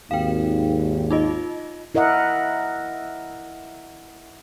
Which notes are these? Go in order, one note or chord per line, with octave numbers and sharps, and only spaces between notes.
G#1 D#2 F5 G5
D#4 F4 D#5
E4 A#4 D#5 E5 F#5